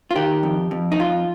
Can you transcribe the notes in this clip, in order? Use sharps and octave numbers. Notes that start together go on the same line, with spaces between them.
F4
D#3 G4
F2
F2
D#4
F2 F4